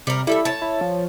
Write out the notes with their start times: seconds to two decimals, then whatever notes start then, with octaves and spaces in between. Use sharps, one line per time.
0.07 C3 G3 A#4
0.27 G3 E4 A4 E5
0.45 C#5 A5
0.62 E4
0.81 F3